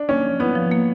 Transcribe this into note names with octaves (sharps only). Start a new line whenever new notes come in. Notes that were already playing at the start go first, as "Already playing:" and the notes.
Already playing: D4
A#3 C#4
F3
B3 E4
F3
A#3